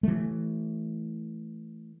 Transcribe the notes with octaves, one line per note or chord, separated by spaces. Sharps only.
E3 A3